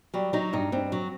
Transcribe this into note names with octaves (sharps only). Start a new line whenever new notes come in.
F#3 G3
F#3 D#4
G2 D#4
G2 C4
F#3